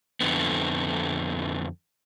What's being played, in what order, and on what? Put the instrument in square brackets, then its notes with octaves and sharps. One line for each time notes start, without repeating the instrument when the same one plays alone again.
[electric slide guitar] F2 D3 B3